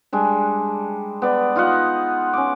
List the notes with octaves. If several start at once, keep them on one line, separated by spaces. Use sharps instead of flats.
G3 G#3 D4
B3 D5
D#4 F4 D#5 F#5
C#4 D6